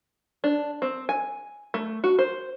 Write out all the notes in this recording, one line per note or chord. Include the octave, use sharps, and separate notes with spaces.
D4
C4
G#5
A3
F#4
C5